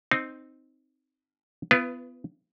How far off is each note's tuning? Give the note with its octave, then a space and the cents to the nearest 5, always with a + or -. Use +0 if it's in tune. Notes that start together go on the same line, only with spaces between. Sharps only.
C4 +0 D#4 +0
B3 +20 F4 -40 B4 +0